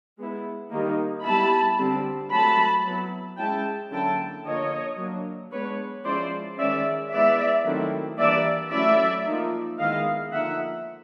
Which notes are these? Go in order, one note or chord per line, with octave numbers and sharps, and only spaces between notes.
G#3 B3 E4
D#3 G3 A#3 D#4
G3 B3 E4 A5 B5
D3 G3 C4
F#3 A3 C4 A5 B5
F#3 B3 E4
G#3 C#4 E4 G5 A5
D3 F#3 A#3 C#4 E4 G5 A5
D3 F3 A#3 C#5 D#5
F#3 A#3 D4
G#3 B3 D4 B4 C#5
F3 G#3 C#4 E4 C5 D5
D#3 G#3 C#4 D5 E5
G#3 B3 E4 D5 E5
D#3 F#3 A3 C4 E4
E3 G3 A#3 D4 D5 E5
F#3 A3 C#4 E4 D5 E5
F3 A#3 D#4
D#3 G#3 B3 E4 D#5 F5
D3 F3 A#3 D#4 E5 F#5